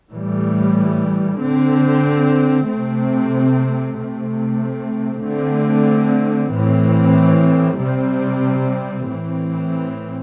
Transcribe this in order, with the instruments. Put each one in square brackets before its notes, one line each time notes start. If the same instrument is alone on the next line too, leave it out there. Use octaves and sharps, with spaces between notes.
[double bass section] A2 E3 G3
D3 C4
C3 A3 C4
C3 A3 C4
D3 A3 C4
A2 E3 C4
C3 G3 C4
A2 E3 C4